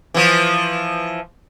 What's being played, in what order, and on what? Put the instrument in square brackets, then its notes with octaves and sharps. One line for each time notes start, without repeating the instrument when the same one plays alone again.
[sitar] E3 F3